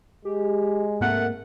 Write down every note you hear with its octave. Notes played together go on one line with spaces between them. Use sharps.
G#3 G4
G#2 A3 A#3 C4 A#4 F#5